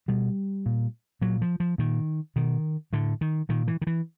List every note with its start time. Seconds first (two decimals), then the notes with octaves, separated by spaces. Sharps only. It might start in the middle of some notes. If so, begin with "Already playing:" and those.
0.08 B2 G3
0.66 A#2
1.21 A#2 F#3
1.42 F3
1.60 F3
1.78 A#2 D#3
2.36 B2 D#3
2.93 A2 D3
3.21 D#3
3.49 A#2 D#3
3.68 E3
3.82 D#3
3.87 E3